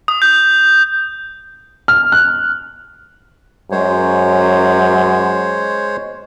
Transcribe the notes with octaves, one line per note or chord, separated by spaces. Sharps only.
D#6
G6
F6
F#6
F#2 G#3 C5 C#5